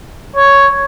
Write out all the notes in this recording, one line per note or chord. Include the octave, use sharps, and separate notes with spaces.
C#5